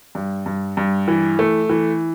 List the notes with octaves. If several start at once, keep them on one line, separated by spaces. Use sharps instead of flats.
G2
G2
G2
E3
A3
E3